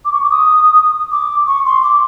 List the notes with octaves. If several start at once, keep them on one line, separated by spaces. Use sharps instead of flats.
D6
C#6
D6
D#6
D6
C#6
C6
D6